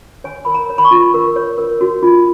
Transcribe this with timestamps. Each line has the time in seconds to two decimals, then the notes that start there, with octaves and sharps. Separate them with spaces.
0.24 C#5 G#5
0.45 A#4 B5
0.54 A#5
0.70 C#5
0.78 B5
0.85 C#6
0.91 F4
1.14 A#4
1.36 C#5
1.58 A#4
1.81 F#4
2.03 F4